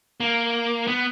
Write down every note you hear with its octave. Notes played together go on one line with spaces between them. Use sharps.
A#3
B3